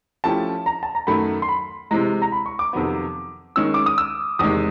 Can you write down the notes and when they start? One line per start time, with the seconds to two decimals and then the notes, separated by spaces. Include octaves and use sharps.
0.24 F3 A3 C#4 E4 G4 A5
0.66 A#5
0.83 A5
0.95 A#5
1.07 F#2 D#3 F#3 A3 B5
1.42 C6
1.49 B5
1.91 C3 E3 G#3 A#5
2.22 A#5
2.32 B5
2.46 C#6
2.59 D6
2.73 F2 C3 D#3 F#3 B3
3.56 D#3 G#3 C#4 E6
3.74 D6
3.86 D#6
3.98 E6
4.39 E2 C3 D#3 G#3 D#6